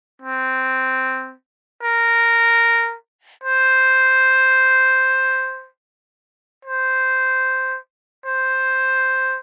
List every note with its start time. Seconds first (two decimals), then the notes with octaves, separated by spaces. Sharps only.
0.22 C4
1.83 A#4
3.44 C5
6.65 C5
8.26 C5